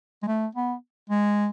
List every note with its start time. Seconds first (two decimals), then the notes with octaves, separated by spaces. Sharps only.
0.23 G#3
0.28 A3
0.55 B3
1.10 G#3